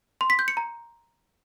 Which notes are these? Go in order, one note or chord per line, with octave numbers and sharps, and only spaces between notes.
C6
B6
G6
C#7
A#5